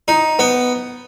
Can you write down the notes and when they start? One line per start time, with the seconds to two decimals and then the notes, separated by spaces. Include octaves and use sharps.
0.08 D#4
0.39 B3